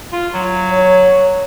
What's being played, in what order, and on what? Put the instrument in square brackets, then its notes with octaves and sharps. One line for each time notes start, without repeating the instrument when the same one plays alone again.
[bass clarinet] F4
F#3
[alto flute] C#5